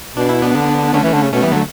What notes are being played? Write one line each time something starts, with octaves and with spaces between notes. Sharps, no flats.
B2 D4
E4
B3 D4
D3
D3 A3 C#4
E3
D3
C#3
B2 A3 C#4
E3 G3 B3
D3 F#3 A3